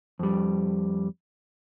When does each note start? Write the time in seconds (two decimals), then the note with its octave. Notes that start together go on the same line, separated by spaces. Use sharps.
0.19 F2 G3